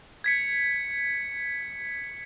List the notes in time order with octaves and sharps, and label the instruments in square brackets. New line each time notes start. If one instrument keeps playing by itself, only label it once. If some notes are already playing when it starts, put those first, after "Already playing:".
[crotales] G#6 B6 C#7